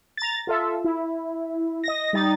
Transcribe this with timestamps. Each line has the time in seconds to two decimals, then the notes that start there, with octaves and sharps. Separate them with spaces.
0.17 A#5 A6
0.47 F4 A4 E5
0.85 E4
1.84 D#5 A#6
2.13 G3 D#4 A6